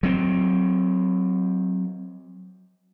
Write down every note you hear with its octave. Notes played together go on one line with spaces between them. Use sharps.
F#3 C4